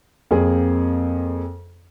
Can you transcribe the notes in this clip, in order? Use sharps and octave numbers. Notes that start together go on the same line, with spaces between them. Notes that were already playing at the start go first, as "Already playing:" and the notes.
F2 A#3 C4 G#4